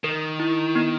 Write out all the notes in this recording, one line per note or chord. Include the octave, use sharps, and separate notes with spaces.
D#3 A#4
E4
B3